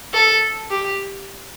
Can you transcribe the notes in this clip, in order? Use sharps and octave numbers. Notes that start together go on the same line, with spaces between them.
A4
G4